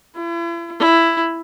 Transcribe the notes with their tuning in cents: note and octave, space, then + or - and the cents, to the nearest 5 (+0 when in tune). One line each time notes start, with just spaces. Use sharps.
E4 +40
E4 +10